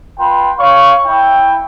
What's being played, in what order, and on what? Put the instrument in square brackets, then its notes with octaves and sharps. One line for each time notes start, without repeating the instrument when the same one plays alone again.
[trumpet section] F4 B4 G5 C6
C#5 F5 C#6
E4 G5